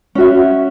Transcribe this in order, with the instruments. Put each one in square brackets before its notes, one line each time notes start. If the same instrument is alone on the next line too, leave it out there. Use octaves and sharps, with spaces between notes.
[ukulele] C#4 F#4 E5